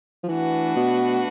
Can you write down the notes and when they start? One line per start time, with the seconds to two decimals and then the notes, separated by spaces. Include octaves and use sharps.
0.24 F3
0.28 E3 A3 D4 F#4 B4
0.76 B2